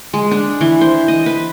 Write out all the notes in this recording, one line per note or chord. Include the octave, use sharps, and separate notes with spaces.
G#3
D4
E3
C5
D#5
B4